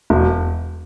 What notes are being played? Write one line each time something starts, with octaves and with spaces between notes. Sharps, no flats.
E1